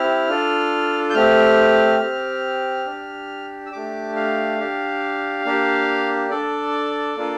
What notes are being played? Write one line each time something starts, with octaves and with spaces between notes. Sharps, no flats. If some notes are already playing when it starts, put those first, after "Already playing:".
Already playing: C4 E4 G4 F6
D4 F4 A4
G6
A3 C4 G4 F6
C4 G4
D4 G4
E6
A3 D4 G4 D6
F5
D4 G4
A#3 D4 G4
D4 A4 D5
A#3 D4 F4 A4